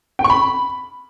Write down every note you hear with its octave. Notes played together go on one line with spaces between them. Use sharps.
G5
C#6
B5